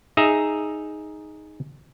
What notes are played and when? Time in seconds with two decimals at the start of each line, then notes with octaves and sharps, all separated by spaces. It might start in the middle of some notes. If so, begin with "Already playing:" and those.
0.17 D#4 G#4 E5 A#5